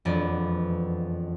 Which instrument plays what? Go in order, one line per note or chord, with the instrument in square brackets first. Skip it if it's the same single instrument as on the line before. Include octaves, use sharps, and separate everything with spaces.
[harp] E1 F2 B3 D5